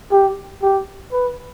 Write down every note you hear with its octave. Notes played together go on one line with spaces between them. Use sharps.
G4
G4
B4